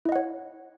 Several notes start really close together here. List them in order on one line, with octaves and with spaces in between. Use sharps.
E4 D#5 F#5 C#5